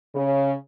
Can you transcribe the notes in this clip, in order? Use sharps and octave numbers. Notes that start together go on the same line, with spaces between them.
C#3